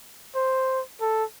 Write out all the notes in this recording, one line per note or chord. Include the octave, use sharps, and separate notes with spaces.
C5
A4